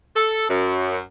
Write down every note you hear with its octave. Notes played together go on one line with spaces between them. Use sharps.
A4
F#2